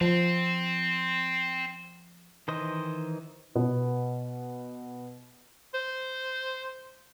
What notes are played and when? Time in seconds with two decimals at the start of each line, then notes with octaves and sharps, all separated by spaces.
0.01 F3 C4 C6
2.48 D#3 E3 C5 D#5
3.55 B2 B3
5.74 C5